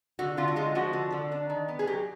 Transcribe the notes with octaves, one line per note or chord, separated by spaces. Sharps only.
D3 F#4
D3 F4
F#4
G#3 F4
F3 F#4
D3
D3
D4
D#3
B3
G#4
F#3 G4